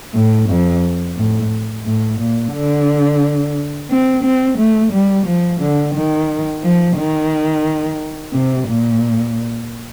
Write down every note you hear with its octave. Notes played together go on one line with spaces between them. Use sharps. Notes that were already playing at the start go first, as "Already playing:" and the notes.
A2
F2
A2
A2
A#2
D3
C4
C4
A3
G3
F3
D3
D#3
F3
D#3
C3
A#2